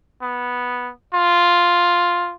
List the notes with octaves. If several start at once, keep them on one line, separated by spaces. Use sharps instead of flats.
B3
F4